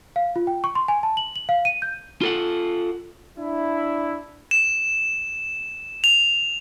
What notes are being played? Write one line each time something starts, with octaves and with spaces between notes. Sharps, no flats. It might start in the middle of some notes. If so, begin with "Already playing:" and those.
F5
F4
G5
C#6
C6
G#5
A5
F#7
F#7
F5
D#7
G6
F4 A4 F#5
D4 E4
E7
F7